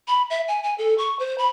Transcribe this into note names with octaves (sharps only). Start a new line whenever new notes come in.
B5
E5
G#5
G#5
A4
C#6
C5
B5